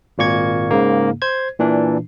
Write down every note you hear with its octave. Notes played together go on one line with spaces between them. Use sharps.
G#1 A#2 A#3 C#6 G#6
G#2 C#3 A#3
C5 G#6
A#2 E3 D4